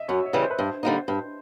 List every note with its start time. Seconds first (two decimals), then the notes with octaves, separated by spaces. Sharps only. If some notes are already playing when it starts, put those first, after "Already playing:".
Already playing: D#5 E5
0.08 F#2 C#5
0.26 C#5
0.33 C#3 E3 G3
0.42 C5
0.50 B4
0.59 G2 C5
0.83 D3 G3 A#3 D#4
1.08 G2